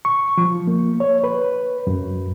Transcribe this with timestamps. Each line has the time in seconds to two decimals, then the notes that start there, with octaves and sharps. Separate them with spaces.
0.05 C#6
0.38 F3
0.67 A#3
1.00 C#5
1.24 B4
1.87 F#2